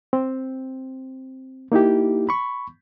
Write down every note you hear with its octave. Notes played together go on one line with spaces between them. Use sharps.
C4
A#3 D#4 E4 G4
B5 C#6